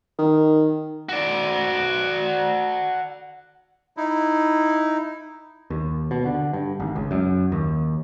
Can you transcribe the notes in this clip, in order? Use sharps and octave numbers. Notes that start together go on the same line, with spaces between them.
D#3
F#4 D5
D#4 E4
D#2
B2
D3
G2
G#1
C#2
F#2
D#2